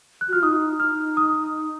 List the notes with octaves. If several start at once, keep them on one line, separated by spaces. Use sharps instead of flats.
F#6
F#4
F4 F6
D#4 D#6
F6
D#6